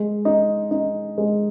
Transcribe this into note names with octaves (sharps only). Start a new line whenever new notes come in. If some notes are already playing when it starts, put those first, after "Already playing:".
Already playing: G#3
D#4
D#4
G#3